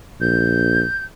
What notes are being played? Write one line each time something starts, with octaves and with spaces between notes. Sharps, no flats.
A#1 G6